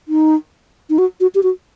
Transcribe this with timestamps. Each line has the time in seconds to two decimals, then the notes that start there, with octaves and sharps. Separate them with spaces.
0.08 D#4
0.90 D#4
0.98 F#4
1.20 F#4
1.35 G4
1.43 F#4